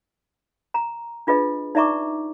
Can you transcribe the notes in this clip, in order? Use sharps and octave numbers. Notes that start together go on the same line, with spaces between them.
A#5
D4 F4 G#4 B4 D#5
D#4 D5 E5 A#5 C#6 D6